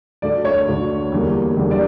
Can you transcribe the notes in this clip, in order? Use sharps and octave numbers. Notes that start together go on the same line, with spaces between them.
D2 D3 A3 D5
C#5
D2 D3 A3
E2 D3 G3 A#3
E2 D3 G3 A#3
D5